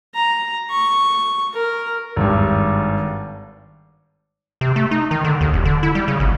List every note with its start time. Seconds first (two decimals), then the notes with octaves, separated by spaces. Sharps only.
0.15 A#5
0.70 C#6
1.53 A#4
2.16 G#1 G2
4.61 C3
4.76 A3
4.91 D#4
5.11 D#3
5.24 D3
5.41 D#2
5.53 E1
5.65 D3
5.83 E4
5.95 G3
6.08 C#3
6.20 G#1